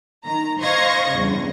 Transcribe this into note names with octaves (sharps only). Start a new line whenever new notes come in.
D#3 A#5
C5 D#5 F5 C#6 G#6 A#6
E2 G2 C#3